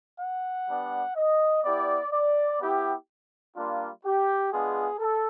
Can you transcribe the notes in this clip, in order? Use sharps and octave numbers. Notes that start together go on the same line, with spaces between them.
F#5
G3 B3 D4
D#5
B3 E4 G4 D5
D5
B3 E4 G4
G3 A#3 D4 F4
G4
G#3 B3 D4 F4 G#4
A4